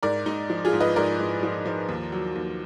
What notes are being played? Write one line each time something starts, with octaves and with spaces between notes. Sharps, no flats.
G#2 A#4 D5
G#2 D#4
F3
F4 G#4
G#2
B4 D#5
G#2 A#4 D5
G#2
F3
F3
D#2
F#3
D#2